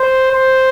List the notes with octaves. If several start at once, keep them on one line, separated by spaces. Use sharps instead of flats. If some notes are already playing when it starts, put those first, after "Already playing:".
Already playing: C5
C5